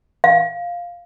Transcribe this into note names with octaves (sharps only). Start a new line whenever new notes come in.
F5